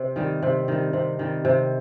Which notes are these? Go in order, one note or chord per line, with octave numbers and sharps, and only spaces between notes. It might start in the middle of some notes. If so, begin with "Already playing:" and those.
Already playing: C3
D#3 G3
C3
D#3 G3
C3
D#3 G3
C3